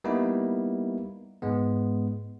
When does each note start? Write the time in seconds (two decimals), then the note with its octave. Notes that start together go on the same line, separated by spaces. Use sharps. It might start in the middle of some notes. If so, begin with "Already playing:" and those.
0.04 G3 A#3 B3 D#4 E4
1.42 G#2 G#3 B3